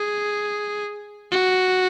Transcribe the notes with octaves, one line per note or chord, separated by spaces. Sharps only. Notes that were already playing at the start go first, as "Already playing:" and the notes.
Already playing: G#4
F#4